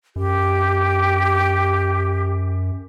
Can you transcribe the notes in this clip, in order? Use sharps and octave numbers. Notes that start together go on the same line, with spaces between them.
F#2 G4